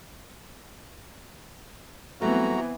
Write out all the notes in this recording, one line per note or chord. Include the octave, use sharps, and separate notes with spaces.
E3 F#3 G3 A3 B3 C4 F#4 A#5